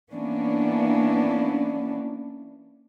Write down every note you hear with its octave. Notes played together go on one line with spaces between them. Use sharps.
E3 A#3 B3 C#4 D4